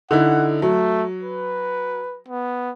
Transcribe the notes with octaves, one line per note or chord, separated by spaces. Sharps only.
D3 D#4 E4 F#5
F#3 A3
B4
B3